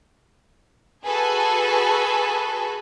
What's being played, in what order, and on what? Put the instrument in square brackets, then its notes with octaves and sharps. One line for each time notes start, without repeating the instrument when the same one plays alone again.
[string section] F#4 G#4 A4 B4 G#5 B5